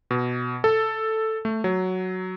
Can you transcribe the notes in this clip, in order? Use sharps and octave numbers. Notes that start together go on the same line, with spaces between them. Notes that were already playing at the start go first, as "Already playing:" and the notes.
B2
A4
A3
F#3